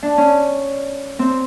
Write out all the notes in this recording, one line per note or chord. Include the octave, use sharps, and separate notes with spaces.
D4
C#4
C4